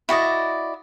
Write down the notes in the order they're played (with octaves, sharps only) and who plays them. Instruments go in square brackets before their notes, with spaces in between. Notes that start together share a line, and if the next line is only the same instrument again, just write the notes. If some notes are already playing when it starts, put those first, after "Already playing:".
[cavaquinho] E4 F#4 D5 D#5